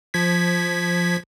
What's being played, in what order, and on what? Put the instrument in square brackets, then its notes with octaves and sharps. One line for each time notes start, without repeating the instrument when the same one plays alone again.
[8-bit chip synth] F3 G#6 B6